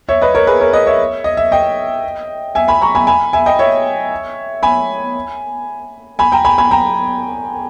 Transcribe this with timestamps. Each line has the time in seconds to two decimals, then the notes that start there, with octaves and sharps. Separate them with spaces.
0.09 C#5 E5
0.21 B4 D#5
0.34 A#4 C#5
0.47 G#4 B4
0.60 A#4 C#5
0.73 B4 D#5
0.86 C#5 E5
1.24 D#5
1.37 E5
1.52 D#5 G5
2.55 E5 G#5
2.68 G#5 B5
2.81 A#5 C#6
2.95 G#5 B5
3.07 G#5 B5
3.33 E5 G#5
3.46 D#5 G5
3.59 C#5 E5
4.63 G#5 B5
6.19 G#5 B5
6.32 G5 A#5
6.45 G#5 B5
6.58 G#5 B5
6.71 G5 A#5